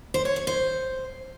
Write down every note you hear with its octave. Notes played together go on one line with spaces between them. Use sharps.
C5
C#5
C#5
C5